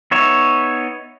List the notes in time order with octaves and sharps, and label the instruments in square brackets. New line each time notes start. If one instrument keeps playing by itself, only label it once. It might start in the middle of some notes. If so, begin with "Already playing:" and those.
[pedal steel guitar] B3 D#4 C#5 E5